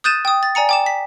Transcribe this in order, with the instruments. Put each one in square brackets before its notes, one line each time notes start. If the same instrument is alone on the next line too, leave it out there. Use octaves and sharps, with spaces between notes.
[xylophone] D#6 F#6 G6 A6 D#7 E7
G5 D#6
A6
D5 G#5 A#5 C#7
G5 D6 E7
B6